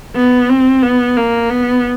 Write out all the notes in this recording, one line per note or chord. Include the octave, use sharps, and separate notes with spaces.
B3
C4
B3
A#3
B3